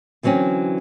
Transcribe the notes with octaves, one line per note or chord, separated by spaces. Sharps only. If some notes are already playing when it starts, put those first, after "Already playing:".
D3 E3 F#3 C4 C#4